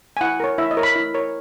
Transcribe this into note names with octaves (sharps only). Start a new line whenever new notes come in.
G#5
E4 F#5
A#4 C#5
E4 E5
D#5
A#4 C#5
B5
E4
A#4 C#5